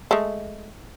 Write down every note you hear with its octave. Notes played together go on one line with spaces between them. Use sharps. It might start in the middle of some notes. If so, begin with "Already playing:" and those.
G#3 A3